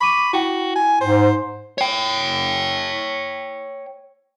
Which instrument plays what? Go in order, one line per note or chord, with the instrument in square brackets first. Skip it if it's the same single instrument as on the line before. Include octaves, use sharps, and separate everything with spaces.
[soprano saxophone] B5 [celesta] C#6 D6 D#7
[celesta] E4 G5 [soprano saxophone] F#4
[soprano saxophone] G#5
[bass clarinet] G#2 [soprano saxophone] C5
[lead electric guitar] C#5 G5